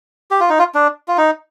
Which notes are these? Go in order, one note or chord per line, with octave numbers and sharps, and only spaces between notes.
G4
F4
D#4
F4
D4
F4
D#4